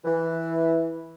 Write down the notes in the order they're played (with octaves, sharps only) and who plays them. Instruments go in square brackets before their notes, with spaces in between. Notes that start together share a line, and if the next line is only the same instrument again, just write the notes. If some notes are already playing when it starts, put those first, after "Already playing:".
[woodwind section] E3